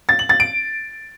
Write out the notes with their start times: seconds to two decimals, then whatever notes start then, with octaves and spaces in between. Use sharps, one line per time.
0.09 A6
0.19 F#7
0.29 A6
0.40 D7